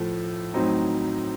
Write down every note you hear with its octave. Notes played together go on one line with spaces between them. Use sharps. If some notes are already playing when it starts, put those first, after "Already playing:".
Already playing: A2 F3 A3
A2 F#3 C4 D#4